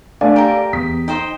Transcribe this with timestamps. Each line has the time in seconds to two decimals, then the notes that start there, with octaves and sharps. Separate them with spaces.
0.21 A3 D4 D5 F5 G#5
0.36 G4 A#4 G5 A#5
0.73 E2 D#6 B6
1.08 D#4 C5 D#5 G5